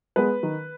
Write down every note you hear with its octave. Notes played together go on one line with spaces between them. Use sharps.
G#3 B3 B4
D#3